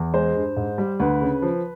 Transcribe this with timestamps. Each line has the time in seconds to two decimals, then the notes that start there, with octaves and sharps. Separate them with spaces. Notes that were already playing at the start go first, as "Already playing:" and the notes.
Already playing: E2
0.14 G#3 C5
0.35 G2
0.57 G#2
0.78 G3
1.00 D2 B4
1.21 C#3
1.42 F3